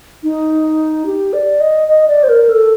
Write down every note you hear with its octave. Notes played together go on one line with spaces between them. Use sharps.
D#4
G4
D5
D#5
D#5
D5
C5
A#4
A4